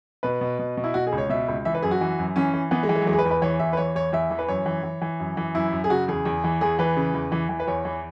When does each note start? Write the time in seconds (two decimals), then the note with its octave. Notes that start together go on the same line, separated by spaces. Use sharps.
0.23 B2 B4
0.41 B2
0.59 B2
0.77 B2
0.84 E4
0.94 B2 F#4
1.07 G#4
1.12 C#2
1.18 C#5
1.29 B2 E5
1.48 C#2
1.65 E3 E5
1.74 B4
1.82 F#2 G#4
1.91 F#4
2.01 E3
2.19 F#2
2.36 E3 C#4
2.54 E3
2.71 E3 B3
2.83 G#3
2.89 E3
2.95 G#3
3.02 F#3
3.07 E2 G#3
3.13 G#4
3.19 B4
3.25 E2
3.31 B4
3.42 E3 C#5
3.59 E2 E5
3.73 B4
3.77 E3 C#5
3.95 E2 C#5
4.13 E2 E5
4.30 E3
4.39 B4
4.48 F#2 C#5
4.66 E3
4.83 E3
5.01 E3
5.20 F#2
5.37 E3
5.55 F#2 E4
5.72 F#2
5.84 G#4
5.90 C#3 F#4
6.08 E2 G#4
6.25 E2
6.44 E3
6.61 E2 G#4
6.79 E3 B4
6.96 C#3
7.14 E2
7.32 E3
7.49 E3
7.60 B4
7.67 E2 C#5
7.85 E3